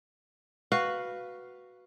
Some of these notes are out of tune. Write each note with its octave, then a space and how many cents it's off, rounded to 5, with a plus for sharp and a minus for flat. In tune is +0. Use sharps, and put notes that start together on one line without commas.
F#4 +0 B4 +0 F5 +0